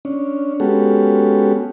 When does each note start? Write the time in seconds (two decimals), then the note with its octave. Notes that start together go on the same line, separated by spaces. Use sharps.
0.05 C#4 D4
0.60 G#3 B3 C#4 F#4 G4 A4